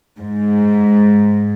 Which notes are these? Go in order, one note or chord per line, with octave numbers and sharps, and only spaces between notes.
G#2